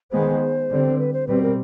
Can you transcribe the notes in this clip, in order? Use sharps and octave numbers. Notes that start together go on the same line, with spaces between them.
D#3 G#3 B3 C5
D3 G3 C4
B4
C5
B2 G3 C4 B4
A#4